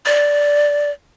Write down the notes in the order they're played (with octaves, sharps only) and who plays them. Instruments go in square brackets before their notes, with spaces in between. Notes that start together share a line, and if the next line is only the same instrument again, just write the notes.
[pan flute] D5